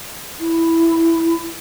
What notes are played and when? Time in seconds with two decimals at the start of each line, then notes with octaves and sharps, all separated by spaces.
0.40 E4